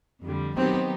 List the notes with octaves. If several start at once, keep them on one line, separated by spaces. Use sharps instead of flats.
F2 D3 G3
D#3 F#3 B3 C4 D#4 G4